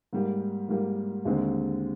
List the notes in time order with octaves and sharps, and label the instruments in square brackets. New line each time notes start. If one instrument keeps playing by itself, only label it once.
[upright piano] G#2 G3 A#3
G#2 G3 A#3
D#2 D3 G#3 C4